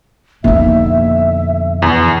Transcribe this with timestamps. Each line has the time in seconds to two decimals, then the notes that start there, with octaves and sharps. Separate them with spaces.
0.44 F2 B2 D3 A#3 D#4 E5
1.82 E2